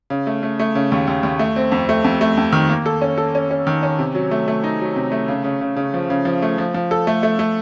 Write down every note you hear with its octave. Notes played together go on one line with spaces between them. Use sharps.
C#3
A3
A3
A3
C#3
D#2
D#2
D#2
A3
C4
F2
A3
F2
A3
F2
D#3
A#3
A4
C#4
A4
C#4
C#4
D#3
C#4
C3
F#3
A3
A3
D#4
F#3
C3
A3
C#3
C#3
C#3
C#3
F3
C#3
F3
A3
F3
F3
A4
A3
A3
A3